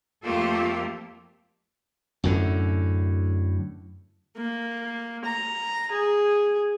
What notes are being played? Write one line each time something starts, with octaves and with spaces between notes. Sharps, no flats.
F2 A3 A#3 F4 G4 A4
F#2 A2 D3
A#3
A#5
G#4